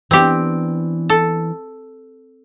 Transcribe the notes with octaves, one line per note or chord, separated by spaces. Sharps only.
E3 B3 C4 D4 G4
A4